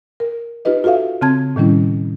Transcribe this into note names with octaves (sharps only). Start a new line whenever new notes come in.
A#4
D#4 F4 G4 B4 D#5
F4 F#4 A4 E5 F5
C#3 C4 A5 G#6
A2 D#3 G3 C#4 E4